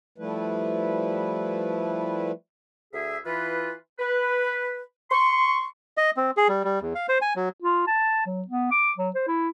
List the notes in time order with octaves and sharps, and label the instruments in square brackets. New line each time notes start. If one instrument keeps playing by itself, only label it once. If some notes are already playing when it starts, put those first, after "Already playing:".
[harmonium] F3 G3 A3 E4 B4
[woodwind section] D2 G#4 E5
E3 F4 B4
B4
C6 C#6
[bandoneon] D#5
C4
G#4
G3
G3
E2
F5
C5
G#5
F#3
[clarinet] F4
A5
F#3
B3
D6
F#3
C5
E4